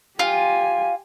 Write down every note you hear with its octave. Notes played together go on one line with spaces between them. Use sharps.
F4 G4 G#5